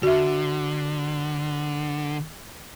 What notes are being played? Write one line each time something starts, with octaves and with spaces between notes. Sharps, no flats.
D3 F#4 E5